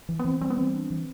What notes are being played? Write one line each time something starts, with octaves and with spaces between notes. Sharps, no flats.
E3
B3
E3 C4
G3 C4
B3
E3 C4
D4
E3